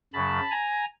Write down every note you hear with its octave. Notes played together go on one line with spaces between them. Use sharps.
F#2 C#3 F#3 A5 B5
G#5 A#5